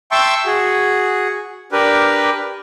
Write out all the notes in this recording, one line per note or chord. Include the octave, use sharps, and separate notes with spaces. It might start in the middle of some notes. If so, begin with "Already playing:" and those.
E5 G5 A5 C6 C#6 E6
F#4 G#4
D4 G4 A#4 B4